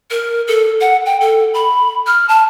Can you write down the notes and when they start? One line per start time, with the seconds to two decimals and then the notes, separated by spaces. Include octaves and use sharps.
0.11 A#4
0.48 A4
0.81 F#5
1.06 G5
1.21 A4
1.54 B5
2.07 F6
2.29 A5